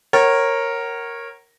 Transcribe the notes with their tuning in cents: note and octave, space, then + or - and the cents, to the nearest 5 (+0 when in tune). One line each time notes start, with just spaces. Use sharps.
A#4 +0 C#5 -20 F#5 +30